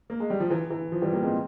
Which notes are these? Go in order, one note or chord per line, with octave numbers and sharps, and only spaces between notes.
A#3
G#3
G3
F3
E3
E3
F3
E3 G3
G3 A#3
G#3 C4